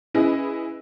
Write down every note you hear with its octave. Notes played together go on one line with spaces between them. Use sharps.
C#4 E4 G#4 B4 D#5